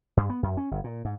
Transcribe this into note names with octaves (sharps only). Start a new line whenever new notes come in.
G2
B3
F#2
C#4
G1
A#2
G#2